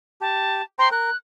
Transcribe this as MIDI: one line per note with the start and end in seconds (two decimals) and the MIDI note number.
0.21 0.62 67
0.21 0.63 81
0.79 0.89 72
0.79 0.89 79
0.79 0.89 82
0.79 0.91 84
0.91 1.10 70
0.91 1.16 90